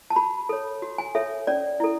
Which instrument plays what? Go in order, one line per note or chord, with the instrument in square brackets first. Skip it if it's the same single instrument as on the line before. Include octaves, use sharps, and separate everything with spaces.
[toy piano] A5
F#4 B5
A4 C#5
F#4
G#5
A4 C#5 E5
C#4 D5
E4 A4